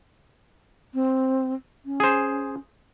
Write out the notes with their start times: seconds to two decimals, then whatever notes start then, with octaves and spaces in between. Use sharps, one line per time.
0.94 C4
1.86 C#4
2.00 G#4 C5